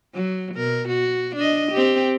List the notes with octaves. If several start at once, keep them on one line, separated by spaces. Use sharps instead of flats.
F#3
B2 A#4
F#4
D4 D#5
C4 G4